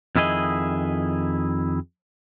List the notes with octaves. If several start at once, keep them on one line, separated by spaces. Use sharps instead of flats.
F2 D#3 E4 G#4 D#5